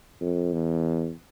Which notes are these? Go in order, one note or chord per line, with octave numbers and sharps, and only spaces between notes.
F2
E2